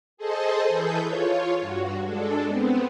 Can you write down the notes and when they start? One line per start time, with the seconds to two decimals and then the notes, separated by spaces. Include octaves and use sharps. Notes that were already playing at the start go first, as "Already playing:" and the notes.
0.17 G#4 A4 C5 D#5 A5
0.68 E3 G#4 A4 B4 G6
1.03 F4 C#5
1.60 G2 F#4
2.04 G#3 D4 A4
2.46 B3 C4